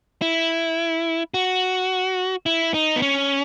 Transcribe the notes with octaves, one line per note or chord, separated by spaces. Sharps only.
E4
F#4
E4
D#4
B3
C#4